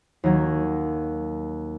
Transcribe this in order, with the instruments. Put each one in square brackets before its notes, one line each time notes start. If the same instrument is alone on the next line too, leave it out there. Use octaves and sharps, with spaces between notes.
[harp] D#2 F#3 G#6